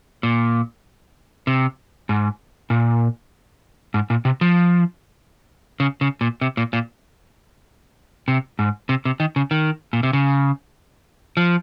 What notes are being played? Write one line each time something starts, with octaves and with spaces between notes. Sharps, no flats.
A#2
C3
G#2
A#2
G#2
A#2
C3
F3
C#3
C#3
A#2
C3
A#2
A#2
C3
G#2
C3
C3
D#3
C#3
D#3
A#2
C3
C#3
F3